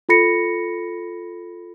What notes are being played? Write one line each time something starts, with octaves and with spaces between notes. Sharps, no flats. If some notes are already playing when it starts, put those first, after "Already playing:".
F4 A4 B5 A#6 C#7